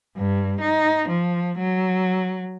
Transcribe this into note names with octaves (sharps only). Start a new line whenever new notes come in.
G2
D#4
F3
F#3